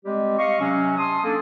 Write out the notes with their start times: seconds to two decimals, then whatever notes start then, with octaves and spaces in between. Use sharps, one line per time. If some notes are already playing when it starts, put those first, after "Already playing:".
0.04 G3 G#3 C4 G4
0.37 D#5 F5 C#6
0.59 C3 F#3 C#4
0.97 A5 C6 D#6
1.24 A#3 C#4 D4 A4